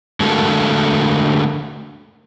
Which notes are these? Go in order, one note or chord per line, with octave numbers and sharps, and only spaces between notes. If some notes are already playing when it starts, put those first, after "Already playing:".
D3 G#3 A3 F#4 A4 A#4